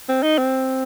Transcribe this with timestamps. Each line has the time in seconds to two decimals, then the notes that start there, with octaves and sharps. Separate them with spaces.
0.09 C4
0.23 D#4
0.38 C4